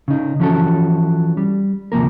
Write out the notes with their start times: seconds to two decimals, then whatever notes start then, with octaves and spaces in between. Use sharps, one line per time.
0.08 C#3 D#4
0.40 E3 F3 C#4 E4 F#4 A4
1.37 G3
1.92 D2 C3 F3 A#3 A#4